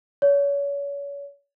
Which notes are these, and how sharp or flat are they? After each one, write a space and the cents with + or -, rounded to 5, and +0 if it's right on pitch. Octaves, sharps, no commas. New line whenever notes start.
C#5 +35